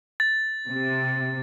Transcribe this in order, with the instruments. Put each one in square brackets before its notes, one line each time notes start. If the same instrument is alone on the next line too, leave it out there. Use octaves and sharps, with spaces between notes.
[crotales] A6
[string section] C3